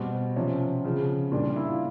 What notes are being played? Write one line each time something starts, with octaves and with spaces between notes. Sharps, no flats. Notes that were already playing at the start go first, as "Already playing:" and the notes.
Already playing: B2 G3 C4
C3 F3 C#4
C#3 F3
A#2 G3 D4
E4
F4